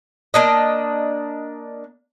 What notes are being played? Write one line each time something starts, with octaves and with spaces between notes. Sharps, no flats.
A#3 D4 D#5